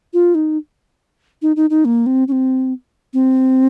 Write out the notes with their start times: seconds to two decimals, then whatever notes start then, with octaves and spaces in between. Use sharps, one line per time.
0.13 F4
0.35 D#4
1.42 D#4
1.56 D#4
1.70 D#4
1.85 A#3
2.06 C4
2.28 C#4
2.32 C4
3.13 C4